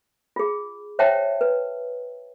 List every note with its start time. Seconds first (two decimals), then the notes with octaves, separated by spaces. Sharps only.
0.36 F4 G#4
0.99 C5 C#5 E5 F#5 G5 A5
1.41 B4